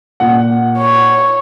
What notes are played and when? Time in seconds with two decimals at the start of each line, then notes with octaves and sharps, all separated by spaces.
0.20 A#2 F#5
0.78 C#5